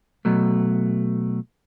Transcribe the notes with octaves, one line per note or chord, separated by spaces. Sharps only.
B2 F#3 A3